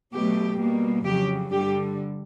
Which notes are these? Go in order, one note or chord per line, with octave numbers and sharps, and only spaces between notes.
B2 F#3 A3 G4
B2 G3 A#3
F2 C#3 F#3 G4
G2 D3 G3 G4